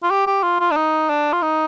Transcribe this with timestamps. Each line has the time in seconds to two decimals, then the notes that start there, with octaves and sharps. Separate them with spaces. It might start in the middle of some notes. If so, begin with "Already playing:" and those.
0.03 F4
0.11 G4
0.27 G4
0.43 F4
0.60 F4
0.71 D4
0.76 D#4
1.09 D4
1.33 F4
1.42 D#4